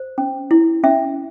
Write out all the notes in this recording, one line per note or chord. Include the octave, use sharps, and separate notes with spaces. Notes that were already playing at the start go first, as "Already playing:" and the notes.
Already playing: C5
C#4
E4
C#4 E5